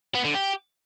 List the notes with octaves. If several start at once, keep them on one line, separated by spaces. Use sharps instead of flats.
B3
D3
G4